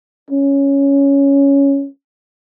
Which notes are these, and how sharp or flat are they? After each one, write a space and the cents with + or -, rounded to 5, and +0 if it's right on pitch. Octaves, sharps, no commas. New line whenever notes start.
C#4 +5